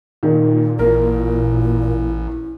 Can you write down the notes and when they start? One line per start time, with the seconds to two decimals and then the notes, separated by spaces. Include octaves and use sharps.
0.23 A#2 D#3
0.79 A1 E4 A#4